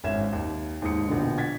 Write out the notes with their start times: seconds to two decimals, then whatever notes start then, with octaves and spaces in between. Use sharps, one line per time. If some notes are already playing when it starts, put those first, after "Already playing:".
0.04 G#1 C#4 E5 G#6 E7
0.33 D#2
0.82 D#2 G#2 D#4 D#6 C#7
1.08 A#1 B2 D3
1.37 F#5 G#6 A6 B6